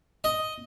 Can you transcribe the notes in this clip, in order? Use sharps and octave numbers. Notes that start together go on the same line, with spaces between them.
D#5